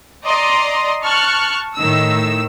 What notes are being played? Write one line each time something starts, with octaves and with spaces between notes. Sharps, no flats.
D5 D#5 A#5 C6
A5 C#6 F6 F#6
A2 D#3 E6